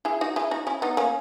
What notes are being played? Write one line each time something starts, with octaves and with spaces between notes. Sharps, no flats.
E4 G#4
D#4 F#4
E4 G#4
D#4 F#4
C#4 E4
B3 D#4
A#3 C#4